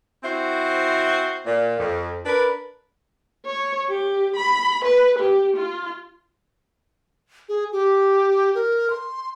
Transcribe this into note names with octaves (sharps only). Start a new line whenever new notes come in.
C4 E4 F#4 C5
A#2
F2
D4 A#4 B4
C#5
G4
B5
B4
G4
F4
G#4
G4
A#4
C6